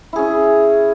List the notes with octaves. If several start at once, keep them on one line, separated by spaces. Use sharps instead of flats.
C#4 E4 G#4